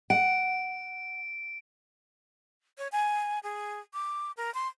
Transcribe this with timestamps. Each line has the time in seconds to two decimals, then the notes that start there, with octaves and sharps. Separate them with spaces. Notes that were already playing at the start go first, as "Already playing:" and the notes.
0.10 F#5 D7
2.78 C#5
2.92 G#5
3.43 G#4
3.94 D6
4.37 A#4
4.55 C6